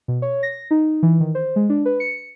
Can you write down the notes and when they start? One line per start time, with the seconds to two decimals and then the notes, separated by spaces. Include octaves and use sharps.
0.08 B2
0.22 C#5
0.43 A#6
0.71 D#4
1.03 E3
1.20 D#3
1.35 C5
1.56 G#3
1.69 D4
1.85 B4
2.00 C#7